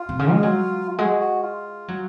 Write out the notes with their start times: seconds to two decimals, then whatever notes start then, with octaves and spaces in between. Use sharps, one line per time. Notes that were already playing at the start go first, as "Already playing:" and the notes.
Already playing: F4
0.09 C3
0.19 C#3
0.31 G#3
0.43 F#3
0.89 F4
0.98 G#3 F#4
1.21 F#4
1.43 F4
1.88 F#3